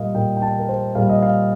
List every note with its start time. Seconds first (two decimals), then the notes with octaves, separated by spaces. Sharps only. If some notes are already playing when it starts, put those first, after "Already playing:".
Already playing: A#2 G3 D#5 F5
0.15 A#2 G3 G5
0.37 G5
0.42 A5
0.59 A#4
0.69 C5
0.95 A#2 G3 F5
1.09 D#5
1.23 F5